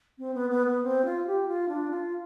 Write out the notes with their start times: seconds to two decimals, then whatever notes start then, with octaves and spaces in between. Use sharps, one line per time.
0.18 C4
0.34 B3
0.50 B3
0.67 B3
0.83 C4
1.05 F4
1.27 G4
1.48 F4
1.69 D4
1.91 F4